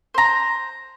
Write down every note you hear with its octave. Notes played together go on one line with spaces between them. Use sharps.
C5 A#5